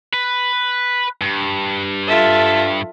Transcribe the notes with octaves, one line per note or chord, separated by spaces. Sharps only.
B4
G2
F4 A4 E5